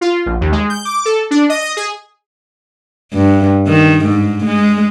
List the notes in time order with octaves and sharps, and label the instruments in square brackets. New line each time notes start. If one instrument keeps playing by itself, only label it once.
[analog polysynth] F4
A#1
D#2
G#3
G6
D6
A4
D4
D#5
D#5
G#4
[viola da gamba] G2
D#3
G#2
G#3